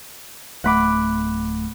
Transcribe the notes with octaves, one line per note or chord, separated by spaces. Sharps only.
D1 A3 F#5 B5 D6